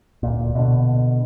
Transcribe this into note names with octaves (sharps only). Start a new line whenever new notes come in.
D1 A#2
B2 D3